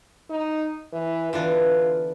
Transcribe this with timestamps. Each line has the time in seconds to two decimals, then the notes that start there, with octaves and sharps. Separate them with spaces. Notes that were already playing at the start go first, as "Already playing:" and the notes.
0.30 D#4
0.93 E3
1.33 D3 E3 B3 F4